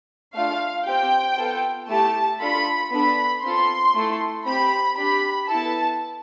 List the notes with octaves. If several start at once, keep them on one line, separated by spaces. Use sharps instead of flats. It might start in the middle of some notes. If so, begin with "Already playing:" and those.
A3 D4 F4 F5
C4 G4 G5
B3 F4 A4
A3 E4 G4 A5
D4 F4 A4 B5
B3 D4 A4 B5
C4 F4 A4 C6
A3 E4 A4
C4 G4 B5
D4 G4 B5
B3 E4 A4 A5